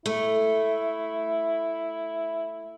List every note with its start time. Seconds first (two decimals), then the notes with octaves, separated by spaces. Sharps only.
0.06 A3 E4